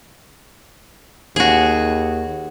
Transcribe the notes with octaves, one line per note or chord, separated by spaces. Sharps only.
D#2 F#4 G#4